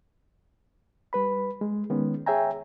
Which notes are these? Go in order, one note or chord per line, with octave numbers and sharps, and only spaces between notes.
G3 B4 B5
G#3
D#3 G#3 B3 C#4
G#4 C#5 E5 G5 G#5 A#5